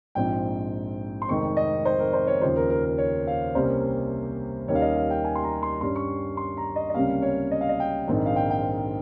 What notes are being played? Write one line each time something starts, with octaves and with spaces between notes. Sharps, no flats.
A#1 G#2 F3 C4 G5
C6
F1 F2 D#3 G#3 C4 C#6
D#5
C5
A#4
C5
C#5
D#2 C#3 F3 C5
A#4
A#4
A#4
C#5
F5
C2 C3 G3 A#3 C#4 C5
D#2 D#3 G3 C#4 C#5
F5
D#5
F5
G5
G#5
C6
A#5
C6
G2 G3 C#4 C6
C#6
C6
A#5
D#5
D#5
C#2 C3 G3 A#3 C#4 F5
C#5
D#5
F5
D#5
G5
A#1 G#2 D#3 G#3 C4
F5
G5
G5